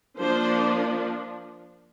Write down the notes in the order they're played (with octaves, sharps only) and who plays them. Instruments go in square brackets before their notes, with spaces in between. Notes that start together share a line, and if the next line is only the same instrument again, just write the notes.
[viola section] F3 A#3 D4 C5